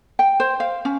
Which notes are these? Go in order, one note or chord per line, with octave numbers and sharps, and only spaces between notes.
G5
C5
F5
C#4